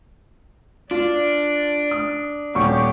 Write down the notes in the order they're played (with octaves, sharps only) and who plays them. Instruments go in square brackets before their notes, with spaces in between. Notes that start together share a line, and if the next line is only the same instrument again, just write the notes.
[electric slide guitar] D4 [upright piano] F4 [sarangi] D5
[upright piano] D#6
[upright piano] D#1 C#6 [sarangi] G4